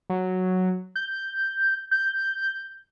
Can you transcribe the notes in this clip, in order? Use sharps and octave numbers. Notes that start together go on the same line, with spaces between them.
F#3
G6
G6